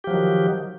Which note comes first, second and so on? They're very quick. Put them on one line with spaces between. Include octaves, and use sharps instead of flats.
G4 F3 F#3 D#3